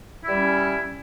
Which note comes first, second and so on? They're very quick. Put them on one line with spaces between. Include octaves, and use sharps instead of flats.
E4 G3 C#4